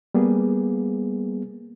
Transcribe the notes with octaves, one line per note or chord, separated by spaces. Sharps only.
G3 A#3 B3 G#4